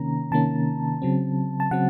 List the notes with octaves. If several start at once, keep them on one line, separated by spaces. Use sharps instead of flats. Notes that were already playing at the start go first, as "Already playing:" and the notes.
Already playing: C3 D#3 A#3 C#4 A#5
C3 D#3 A#3 C#4 A5
C#3 F#3 C4
A5
C#3 F#3 C4 F#5